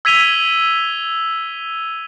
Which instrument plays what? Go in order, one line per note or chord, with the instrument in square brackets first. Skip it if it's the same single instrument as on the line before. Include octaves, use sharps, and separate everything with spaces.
[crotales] E6 G#6 B6 D#7 F7 G7